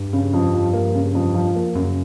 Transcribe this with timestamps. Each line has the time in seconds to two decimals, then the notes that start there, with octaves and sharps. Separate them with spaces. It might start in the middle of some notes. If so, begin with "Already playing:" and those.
Already playing: G2
0.13 C#3
0.33 F2
0.53 F3
0.73 A#3
0.95 C#3
1.15 F2
1.34 F3
1.55 A#3
1.75 F#2 C#3